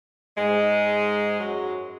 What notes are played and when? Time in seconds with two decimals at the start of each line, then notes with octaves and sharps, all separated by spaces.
0.37 G#2 G#3
1.40 F#2 F#3